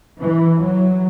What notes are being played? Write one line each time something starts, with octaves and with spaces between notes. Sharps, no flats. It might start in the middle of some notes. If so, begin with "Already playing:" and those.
E3
F#3